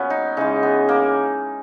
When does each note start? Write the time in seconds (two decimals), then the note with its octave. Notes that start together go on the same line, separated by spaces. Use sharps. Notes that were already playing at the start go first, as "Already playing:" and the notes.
Already playing: A#2 F#3 B3 C#4
0.10 D#4
0.37 C#3 E3 G#3 D#4
0.63 B3
0.89 A#3